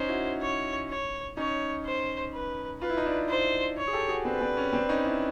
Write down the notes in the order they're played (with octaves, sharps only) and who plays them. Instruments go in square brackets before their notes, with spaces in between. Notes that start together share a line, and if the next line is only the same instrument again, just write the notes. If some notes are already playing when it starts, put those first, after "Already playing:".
Already playing: [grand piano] C#4 D#4 [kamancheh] C5
[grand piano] E4 F#4
[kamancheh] C#5
C#5
[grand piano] C#4 D#4 [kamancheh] C#5
[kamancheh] C5
B4
[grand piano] F4 [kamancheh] B4
[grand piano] E4
D#4
D4 E4
[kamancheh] C5
C#5
[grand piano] G#4
G4 A4
F#4 G#4
[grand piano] C4 D4 [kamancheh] B4
[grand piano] C4 D4
C#4
C4 D4
C#4 D#4
D4 E4